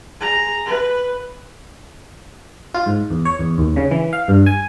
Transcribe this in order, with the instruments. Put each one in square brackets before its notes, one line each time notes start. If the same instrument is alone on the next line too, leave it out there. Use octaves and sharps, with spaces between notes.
[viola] G#4 A#5
B4
[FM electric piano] F4
G#2
E2
C#5
E2
D#2
C#3
E3
F5
G2
G#5